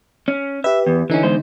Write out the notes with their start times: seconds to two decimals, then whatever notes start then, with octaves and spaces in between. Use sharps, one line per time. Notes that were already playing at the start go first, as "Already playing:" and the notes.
0.28 C#4
0.64 G4 B4 E5
0.87 E2
1.10 D3 E3 C#4 D#4
1.23 E2 G#3 C5